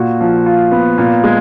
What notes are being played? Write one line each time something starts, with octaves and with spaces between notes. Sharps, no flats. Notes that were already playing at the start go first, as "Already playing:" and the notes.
Already playing: A#2 F#4
F3
F4
B3
A#2
G#3